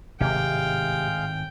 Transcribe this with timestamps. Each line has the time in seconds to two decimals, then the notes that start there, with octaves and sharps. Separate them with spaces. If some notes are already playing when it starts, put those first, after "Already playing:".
0.21 G#1 A2 C3 G#3 F5 G5